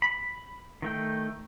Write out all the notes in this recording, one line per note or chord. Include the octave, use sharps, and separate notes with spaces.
B5
D#3 A3 G5